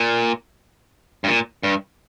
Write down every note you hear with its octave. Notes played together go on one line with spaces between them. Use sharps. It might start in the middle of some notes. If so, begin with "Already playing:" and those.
Already playing: A#2
G2
A#2
G2